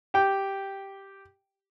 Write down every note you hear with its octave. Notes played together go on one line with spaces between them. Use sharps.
G4 G5